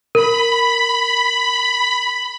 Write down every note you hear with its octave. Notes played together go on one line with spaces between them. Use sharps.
A#4 B5